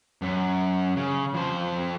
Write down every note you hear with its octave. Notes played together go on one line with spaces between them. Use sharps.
F#2
C#3
F2 C5